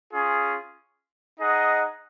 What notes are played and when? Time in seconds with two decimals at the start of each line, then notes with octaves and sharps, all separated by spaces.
0.13 C#4 F4 G#4
1.39 D#4 G#4 D#5 F#5